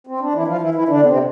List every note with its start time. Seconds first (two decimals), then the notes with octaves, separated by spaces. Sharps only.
0.07 C4
0.20 D4
0.34 E3 E4
0.47 F3 F4
0.60 E3 E4
0.74 E3 E4
0.88 D3 D4
1.02 B3
1.06 C3 C4